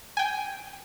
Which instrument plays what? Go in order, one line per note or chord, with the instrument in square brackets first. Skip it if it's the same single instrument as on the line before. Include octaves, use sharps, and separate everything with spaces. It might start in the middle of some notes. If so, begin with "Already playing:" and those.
[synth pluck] G5 G#5